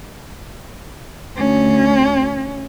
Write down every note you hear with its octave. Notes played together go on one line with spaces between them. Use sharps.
D2 C#4